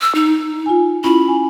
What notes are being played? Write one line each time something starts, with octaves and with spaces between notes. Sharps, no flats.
E6
D#4
F4 G#5
C#4 E4 F4 B5
G#5